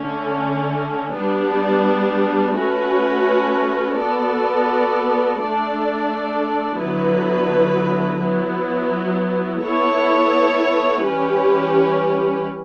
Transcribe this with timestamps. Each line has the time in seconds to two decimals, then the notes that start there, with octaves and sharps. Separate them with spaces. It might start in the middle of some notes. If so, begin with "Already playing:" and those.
Already playing: D3 A3 C#4
1.13 G3 B3 D4
2.54 A3 C#4 F#4 B4
3.96 B3 F#4 A4 D5
5.37 A3 D4 A4 D5
6.78 D3 F#3 B3 E4 B4
8.20 F#3 B3 E4
9.61 B3 E4 A4 C#5
11.03 E3 G3 C#4 G4 B4